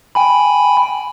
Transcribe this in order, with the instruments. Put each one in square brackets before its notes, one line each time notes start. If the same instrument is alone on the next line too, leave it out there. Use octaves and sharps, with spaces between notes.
[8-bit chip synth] G5 G#5 B5